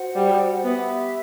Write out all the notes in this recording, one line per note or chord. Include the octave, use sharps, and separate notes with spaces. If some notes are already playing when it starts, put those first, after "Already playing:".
Already playing: F#4 C5 F#5
G3
B3 G4 B4 E5